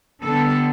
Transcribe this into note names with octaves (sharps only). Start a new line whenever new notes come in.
D3 G3 B3 A4